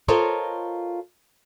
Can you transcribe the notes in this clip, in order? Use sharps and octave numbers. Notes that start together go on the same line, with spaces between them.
F4 A4 A#4 C5 C#5 D#5